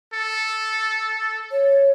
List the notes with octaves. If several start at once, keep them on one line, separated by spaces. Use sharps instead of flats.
A4
C#5